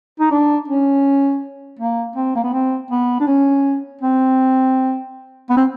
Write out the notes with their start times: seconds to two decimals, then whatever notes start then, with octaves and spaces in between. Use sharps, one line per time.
0.20 D#4
0.31 D4
0.68 C#4
1.79 A#3
2.16 C4
2.35 A#3
2.44 B3
2.53 C4
2.91 B3
3.20 D4
3.27 C#4
4.01 C4
5.50 B3
5.57 C4